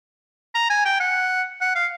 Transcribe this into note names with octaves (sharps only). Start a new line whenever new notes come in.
A#5
G#5
G5
F#5
F#5
F5